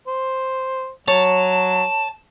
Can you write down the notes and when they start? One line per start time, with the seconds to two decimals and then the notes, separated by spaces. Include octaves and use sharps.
0.07 C5
1.08 F#3 C#5 A5